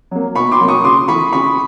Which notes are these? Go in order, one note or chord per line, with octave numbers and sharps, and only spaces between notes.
F#3 A#3
B2 B5 C#6
C6 D6
F#3 A#3
C#6 D#6
C#3 C6 D6
E3 A3 B5 C#6
C#3 B5 C#6